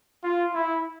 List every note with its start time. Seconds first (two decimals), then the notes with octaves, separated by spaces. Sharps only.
0.23 F4
0.54 E4